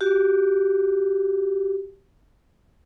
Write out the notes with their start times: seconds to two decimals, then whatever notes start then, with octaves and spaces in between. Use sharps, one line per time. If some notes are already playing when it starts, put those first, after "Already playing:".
0.01 F#4 G4